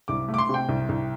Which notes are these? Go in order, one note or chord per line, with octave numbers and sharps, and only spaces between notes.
C2 D6
A3
D6
C6
C3 G5
C2
C2